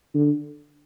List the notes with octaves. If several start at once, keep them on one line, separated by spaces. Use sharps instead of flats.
D3